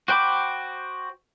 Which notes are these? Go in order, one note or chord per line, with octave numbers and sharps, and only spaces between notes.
F#4 C5 G5 B5 D6